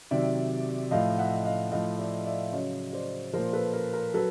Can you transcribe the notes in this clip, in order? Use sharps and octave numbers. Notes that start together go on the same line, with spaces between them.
C3 D#3 F#3 D5 E5
A2 F3 D#5 F5
E5 F#5
D#5 F5
A2 F3 D#5 F5
D5 E5
D5 E5
C#3 F#3 C#5 D#5
C5 D5
A#2 F3 A#4 C5
A4 B4
A#4
A#4
F#3 A4 B4